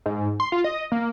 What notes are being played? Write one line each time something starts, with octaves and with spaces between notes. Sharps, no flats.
G#2
C6
F4
D#5
A#3